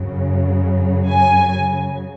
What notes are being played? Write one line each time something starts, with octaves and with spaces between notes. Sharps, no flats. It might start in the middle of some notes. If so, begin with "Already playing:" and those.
Already playing: F#2 C#3 F#3
G#5